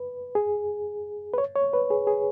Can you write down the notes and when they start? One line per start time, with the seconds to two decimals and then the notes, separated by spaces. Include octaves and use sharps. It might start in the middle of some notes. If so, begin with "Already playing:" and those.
Already playing: B4
0.35 G#4
1.34 B4
1.38 C#5
1.56 C#5
1.73 B4
1.91 G#4
2.07 G#4